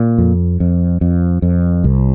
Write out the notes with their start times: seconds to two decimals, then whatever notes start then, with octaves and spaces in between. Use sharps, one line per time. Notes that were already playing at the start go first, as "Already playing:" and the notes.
Already playing: A#2
0.18 F2
0.60 F2
1.01 F2
1.42 F2
1.84 C2